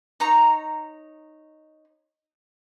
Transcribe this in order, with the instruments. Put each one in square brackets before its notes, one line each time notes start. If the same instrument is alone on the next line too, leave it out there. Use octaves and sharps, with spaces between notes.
[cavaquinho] D#4 C#5 A#5